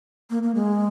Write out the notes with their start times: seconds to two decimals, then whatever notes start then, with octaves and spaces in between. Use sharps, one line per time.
0.30 A#3
0.43 A#3
0.55 G#3